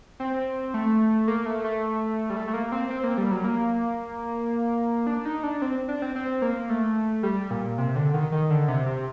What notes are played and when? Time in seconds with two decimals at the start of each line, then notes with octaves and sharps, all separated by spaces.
0.20 C4
0.74 A3
1.28 A#3
1.46 A3
1.64 A3
2.30 G3
2.36 A3
2.47 A3
2.54 A#3
2.72 C4
2.90 C4
3.04 A#3
3.18 G3
3.31 F#3
3.44 A#3
5.07 D4
5.25 D#4
5.43 D4
5.62 C4
5.88 D4
6.02 C4
6.15 C4
6.42 A#3
6.70 A3
7.23 G3
7.51 A#2
7.78 C3
7.96 D3
8.14 D#3
8.32 D#3
8.50 D3
8.68 C3
8.86 C3